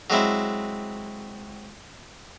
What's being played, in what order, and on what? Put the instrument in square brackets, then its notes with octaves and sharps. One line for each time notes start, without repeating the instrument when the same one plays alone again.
[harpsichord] F#3 G#3 C4 E4